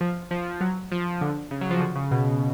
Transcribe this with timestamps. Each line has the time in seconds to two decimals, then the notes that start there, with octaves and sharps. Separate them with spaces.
0.01 F3
0.31 F3
0.61 F#3
0.92 F3
1.21 D3
1.51 C#3
1.61 F#3
1.70 F3
1.81 D3
1.95 C#3
2.11 B2